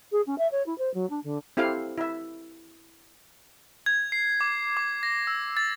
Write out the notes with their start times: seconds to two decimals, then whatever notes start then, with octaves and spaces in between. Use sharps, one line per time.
0.12 G#4
0.26 C#4
0.38 E5
0.51 C#5
0.66 E4
0.78 C5
0.94 F#3
1.10 D4
1.24 D3
1.57 C4 E4 G4 A4 F5
1.98 E4 E5
3.86 G#6
4.12 C7
4.41 D6
4.77 D6
5.03 A#6
5.27 E6
5.57 A6